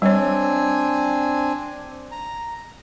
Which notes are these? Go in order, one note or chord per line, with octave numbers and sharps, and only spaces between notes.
G3 C4 D4 C#5 G#5
A#5